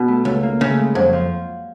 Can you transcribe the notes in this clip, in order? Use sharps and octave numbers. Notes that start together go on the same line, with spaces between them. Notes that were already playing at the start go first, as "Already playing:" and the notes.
Already playing: B2
A3
C#2 A3
A#3
C#3
A3
G#3
F2 F#3
F3